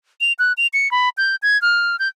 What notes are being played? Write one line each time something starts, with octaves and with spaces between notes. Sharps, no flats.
F7
F#6
F7
C#7
B5
G6
G#6
F6
G6